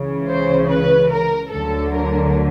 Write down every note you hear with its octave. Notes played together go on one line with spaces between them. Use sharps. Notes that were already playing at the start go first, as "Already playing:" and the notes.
Already playing: C#2 C#3 E3
C5
B4
A#4
D2 D3 F#3 A4
A#4